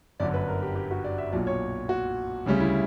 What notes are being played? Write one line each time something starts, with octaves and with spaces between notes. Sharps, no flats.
G1 F#2 D3 D5
B4
A#4
G4
G4
F#4
D5
E5
B1 A#2 F#3 D5
C#5
F#4
D2 C#3 G3 C#4
E4